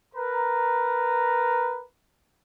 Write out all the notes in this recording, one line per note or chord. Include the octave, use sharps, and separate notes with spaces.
A#4 B4 A#5